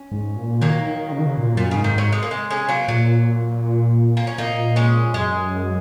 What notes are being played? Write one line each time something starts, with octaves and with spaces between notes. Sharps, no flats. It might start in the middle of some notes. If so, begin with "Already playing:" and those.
Already playing: C#4
G#2
A#2
D#3 F#3 A#3
D#3
C#3
D#3
C#3
A#2
F#2 A#2
G#2 C#3
D#3
G#2 F#3
G#3
A#3
G#3
G#3 C#4
F#3 A#3
A#2 F#3
A#3
C#4
A#2 A#3 D#4
G#3 C#4
F#2 G#3